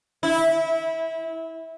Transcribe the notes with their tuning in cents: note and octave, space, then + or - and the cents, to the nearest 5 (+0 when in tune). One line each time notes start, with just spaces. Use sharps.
E4 -20